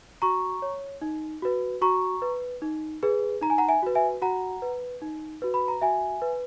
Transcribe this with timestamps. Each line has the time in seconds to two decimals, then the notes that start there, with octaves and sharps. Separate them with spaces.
0.22 F#4 A#5 C#6
0.62 C#5
1.01 D#4
1.42 F#4 B4
1.82 F#4 A#5 C#6
2.22 B4
2.62 D#4
3.03 G#4 B4
3.41 D#4 A#5
3.50 G#5
3.58 F#5 A#5
3.68 E5 G#5
3.83 F#4 B4
3.95 E5 G#5
4.22 F#4 F#5 A#5
4.62 B4
5.02 D#4
5.42 F#4 B4
5.54 B5
5.68 A#5
5.81 F#4 E5 G#5
6.22 B4